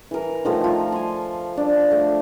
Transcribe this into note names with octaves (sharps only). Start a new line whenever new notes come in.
E3 A#4
D#3 F3 A3
F4
G#5 C6
D4
A3